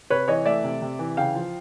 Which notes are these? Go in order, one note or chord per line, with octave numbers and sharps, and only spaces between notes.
C3 B4 C#5
E3 C#5 D#5
A3 D5 E5
C3
C3
E3
C#3 F5 G5
F3